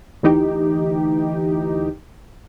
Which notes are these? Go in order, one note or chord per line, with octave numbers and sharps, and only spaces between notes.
D2 E3 D#4 G4